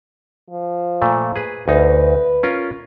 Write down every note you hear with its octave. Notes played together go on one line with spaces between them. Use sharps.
F3
A#2 A3
G#4 B4
D2 D#4 B4
C#4 F4 A#4